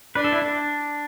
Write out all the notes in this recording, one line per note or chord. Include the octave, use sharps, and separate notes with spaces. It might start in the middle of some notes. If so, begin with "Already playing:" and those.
D4 B4
A4
E4
D4